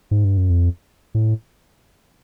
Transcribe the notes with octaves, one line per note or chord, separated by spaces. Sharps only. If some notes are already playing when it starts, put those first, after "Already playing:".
G#2
G2
F#2
F2
A2